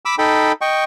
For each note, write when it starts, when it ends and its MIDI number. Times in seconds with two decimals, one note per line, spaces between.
0.05 0.15 83
0.05 0.15 86
0.05 0.15 88
0.19 0.52 63
0.19 0.52 69
0.19 0.52 79
0.19 0.52 83
0.61 0.84 75
0.61 0.84 79
0.61 0.84 85